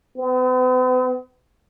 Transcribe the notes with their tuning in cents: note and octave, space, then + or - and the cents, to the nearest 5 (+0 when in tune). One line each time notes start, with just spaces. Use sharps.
B3 +45